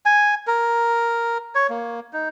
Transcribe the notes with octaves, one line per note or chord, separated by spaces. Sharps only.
G#5
A#4
C#5
A#3
D#4